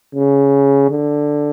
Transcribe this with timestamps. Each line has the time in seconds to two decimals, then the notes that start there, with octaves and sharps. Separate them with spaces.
0.15 C#3
0.90 D3